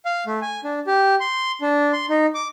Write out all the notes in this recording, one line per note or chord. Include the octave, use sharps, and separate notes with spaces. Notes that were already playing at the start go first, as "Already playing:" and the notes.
F5
A3
G#5
D4
G4
C6
D4
C6
D#4
D6